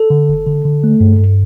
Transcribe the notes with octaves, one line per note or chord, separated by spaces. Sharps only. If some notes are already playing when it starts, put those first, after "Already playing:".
Already playing: A4
D3
G1
D3
D3
A3
G2
G2